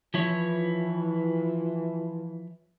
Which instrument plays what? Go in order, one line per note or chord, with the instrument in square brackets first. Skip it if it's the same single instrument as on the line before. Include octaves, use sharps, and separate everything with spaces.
[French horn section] E3 F4 [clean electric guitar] F3 E4 C#5